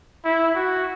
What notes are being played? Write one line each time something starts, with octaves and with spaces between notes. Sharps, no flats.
E4
F#4